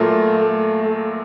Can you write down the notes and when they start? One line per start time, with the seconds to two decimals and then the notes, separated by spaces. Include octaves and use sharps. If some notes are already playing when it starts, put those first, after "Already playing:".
Already playing: A#2 F#3 A3 A#3 F4 A#4
0.39 A3
0.84 A3